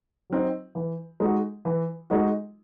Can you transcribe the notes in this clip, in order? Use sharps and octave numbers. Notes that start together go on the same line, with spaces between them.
F#3 C4 D#4
E3
G#3 D#4 F#4
E3
G#3 D#4 F#4